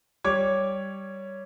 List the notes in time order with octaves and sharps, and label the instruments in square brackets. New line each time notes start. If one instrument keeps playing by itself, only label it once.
[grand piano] G3 C#5 D6 G#6